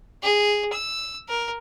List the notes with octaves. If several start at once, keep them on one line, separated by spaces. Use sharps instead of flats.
G#4
E6
A#4